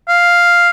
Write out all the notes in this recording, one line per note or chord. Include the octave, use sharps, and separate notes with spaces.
F5